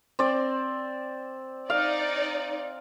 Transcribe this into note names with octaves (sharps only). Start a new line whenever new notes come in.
C4 D5
D#4 D5 F5